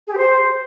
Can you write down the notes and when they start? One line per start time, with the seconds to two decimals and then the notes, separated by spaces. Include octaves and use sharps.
0.07 G#4
0.12 G4
0.17 C5